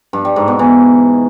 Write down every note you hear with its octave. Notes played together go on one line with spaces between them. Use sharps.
G2
G3
G#2
B2
E3